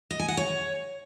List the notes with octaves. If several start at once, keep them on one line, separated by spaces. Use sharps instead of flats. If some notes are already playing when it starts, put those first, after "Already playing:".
D#5
G#5
F#5
C#5